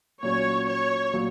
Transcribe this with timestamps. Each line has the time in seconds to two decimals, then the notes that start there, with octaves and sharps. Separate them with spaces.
0.22 A#2 F#3 C#4 C#5
0.68 C#5
1.14 A#2 F#3